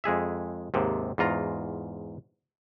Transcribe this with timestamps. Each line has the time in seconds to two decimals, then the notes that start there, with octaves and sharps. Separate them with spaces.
0.04 F2 G#3 G#4 E5
0.74 D#2 G#2 C3
1.18 E2 G#2 F4 A#5